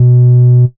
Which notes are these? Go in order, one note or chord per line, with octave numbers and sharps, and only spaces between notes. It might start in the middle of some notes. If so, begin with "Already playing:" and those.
Already playing: B2